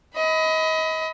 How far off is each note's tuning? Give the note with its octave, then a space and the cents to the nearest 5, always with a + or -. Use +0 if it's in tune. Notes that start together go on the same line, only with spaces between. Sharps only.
D#5 +30 B5 +20